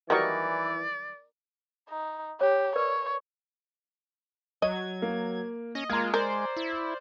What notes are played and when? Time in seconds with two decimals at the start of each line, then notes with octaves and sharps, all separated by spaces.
0.10 D#3 E3 F#3 G3 A#4 D5 D#5 C#6
1.89 D#4
2.41 G4 C#5
2.76 A#4 B4 C#5 D5
4.62 F#3 D#5 G#6 D#7
5.02 A#3
5.75 C#4 D#5
5.90 G#3 A#3 F4 A#5 F6 G#6
6.14 A#4 C5 D5
6.57 E4